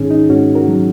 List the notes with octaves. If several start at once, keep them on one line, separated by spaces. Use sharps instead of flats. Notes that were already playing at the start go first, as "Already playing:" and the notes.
Already playing: G#2 D#3 C#4 D#4 G#4
D#4
G#2 C#4 F#4
F#4 A#4
F#3